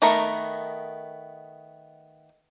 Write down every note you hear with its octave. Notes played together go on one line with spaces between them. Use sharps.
D#3 A3 B3 A#4